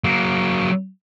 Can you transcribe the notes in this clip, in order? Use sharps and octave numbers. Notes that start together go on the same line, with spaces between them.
F#3 A#3